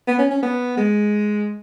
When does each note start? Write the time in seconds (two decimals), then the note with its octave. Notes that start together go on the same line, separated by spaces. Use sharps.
0.08 B3
0.19 C#4
0.31 C#4
0.43 B3
0.77 G#3